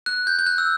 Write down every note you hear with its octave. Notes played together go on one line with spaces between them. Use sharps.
F#6
G6
G6
F#6
E6